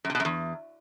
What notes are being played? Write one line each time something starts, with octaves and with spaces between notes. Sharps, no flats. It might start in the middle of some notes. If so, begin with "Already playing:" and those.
F#2
C3
B2
F#2
E2